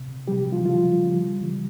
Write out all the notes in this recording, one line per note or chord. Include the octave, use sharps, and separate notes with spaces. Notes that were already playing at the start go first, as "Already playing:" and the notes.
Already playing: C3
C3 F3 G3 G4
F3 F4
C#3 F3 G3 F4
C#3 G3
C#3 E3 G3